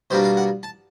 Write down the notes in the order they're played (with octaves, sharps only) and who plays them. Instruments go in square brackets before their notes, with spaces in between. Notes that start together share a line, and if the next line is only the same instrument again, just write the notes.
[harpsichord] B2 G3 A#3 D4 C5
F5
F#5
A5